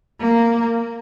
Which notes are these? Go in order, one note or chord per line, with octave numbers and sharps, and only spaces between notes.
A#3